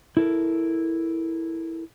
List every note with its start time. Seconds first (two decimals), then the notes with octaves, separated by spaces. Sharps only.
0.17 E4 A4 A#4